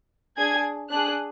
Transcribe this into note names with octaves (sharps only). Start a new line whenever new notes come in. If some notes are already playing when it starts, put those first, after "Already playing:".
D4 G#4 G#6
D4 G#4 F#6